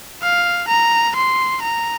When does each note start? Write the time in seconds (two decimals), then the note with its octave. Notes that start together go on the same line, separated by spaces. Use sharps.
0.22 F5
0.68 A#5
1.16 C6
1.62 A#5